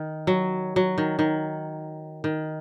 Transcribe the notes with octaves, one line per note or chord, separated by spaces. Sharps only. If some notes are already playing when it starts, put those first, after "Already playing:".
Already playing: D#3
F#3
F#3
D#3
D#3
D#3